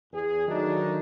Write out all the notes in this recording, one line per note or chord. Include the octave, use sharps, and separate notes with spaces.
E2 G#4
D#3 F#3 A3 D4 D#4